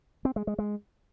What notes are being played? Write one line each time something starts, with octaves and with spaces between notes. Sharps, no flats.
C4
G#3
G#3
G#3